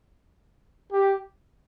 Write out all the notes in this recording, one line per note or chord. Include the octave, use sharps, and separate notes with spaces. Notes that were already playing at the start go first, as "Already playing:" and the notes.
G4